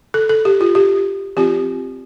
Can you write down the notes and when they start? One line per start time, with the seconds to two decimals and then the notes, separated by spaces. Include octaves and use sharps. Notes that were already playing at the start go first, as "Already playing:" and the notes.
0.14 A4
0.29 A4
0.45 G4
0.61 F4
0.75 G4
1.37 F3 C4 F4 G4